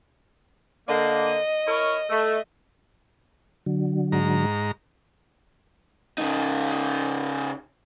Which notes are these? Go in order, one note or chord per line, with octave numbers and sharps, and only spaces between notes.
D3 A#3 D#5
E4 A#4 C#5
A3
D3 F#3
G#2 A#5
C#3 D#4